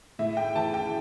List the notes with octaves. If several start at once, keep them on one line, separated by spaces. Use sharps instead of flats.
A2 E5
G5
E3 A5
G5